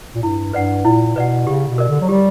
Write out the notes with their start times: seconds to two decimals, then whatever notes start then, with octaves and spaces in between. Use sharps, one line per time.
0.15 A#2
0.23 G2 E4
0.53 G2 B4 D5 F#5
0.85 A#2 E4
1.16 B2 B4 D5 F#5
1.47 C#3 G4
1.68 B2
1.78 A#4 D5
1.89 D3
2.01 F#3
2.09 G3 G4